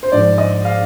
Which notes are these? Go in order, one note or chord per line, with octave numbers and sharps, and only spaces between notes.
C5
G#2 F3 D5
D#5
F5